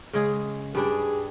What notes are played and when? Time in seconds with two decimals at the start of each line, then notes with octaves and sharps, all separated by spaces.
0.13 C#3 G#3 G#4
0.75 G2 G3 D4 G#4